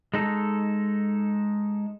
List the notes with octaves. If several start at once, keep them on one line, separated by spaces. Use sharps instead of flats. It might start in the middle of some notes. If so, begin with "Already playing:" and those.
G#3 D#4 A4